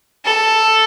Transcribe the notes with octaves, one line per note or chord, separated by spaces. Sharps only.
A4